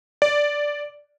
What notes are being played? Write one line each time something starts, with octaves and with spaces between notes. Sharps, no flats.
D5